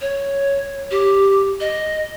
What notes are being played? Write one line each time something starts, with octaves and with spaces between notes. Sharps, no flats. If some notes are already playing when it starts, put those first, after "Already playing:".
C#5
G4
D#5